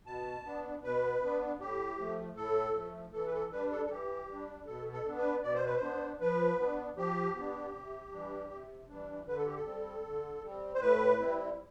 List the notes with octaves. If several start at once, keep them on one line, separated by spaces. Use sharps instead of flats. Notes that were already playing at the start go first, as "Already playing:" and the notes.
B2 A5
B3 D4
B2 B4
B3 D4
A2 G4
F3 A3
A2 A4
F3 A3
E3 A4
B4
A4
G3 D4 B4
A4
A4
E3 G4
G3 D4
B2 A4
A4
B3 D4
B4
B2 D5
C5
B4
C5
B3 D4
F3 B4
B3 D4
F3 G4
B3 D4
C3
E3 G3 D4
C3
E3 G3 D4
D3 B4
A4
G4
A4
G3 C4
D3
G3 C4
C5
A2 B4
G3 C4 E4